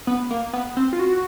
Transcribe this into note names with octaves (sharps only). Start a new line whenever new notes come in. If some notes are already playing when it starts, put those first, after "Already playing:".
B3
A#3
B3
C4
F4
F#4